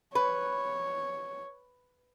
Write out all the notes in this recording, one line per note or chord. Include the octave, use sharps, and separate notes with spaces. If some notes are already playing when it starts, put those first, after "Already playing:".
B4 C#5